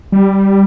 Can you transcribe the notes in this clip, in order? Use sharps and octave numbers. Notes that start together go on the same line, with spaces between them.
G3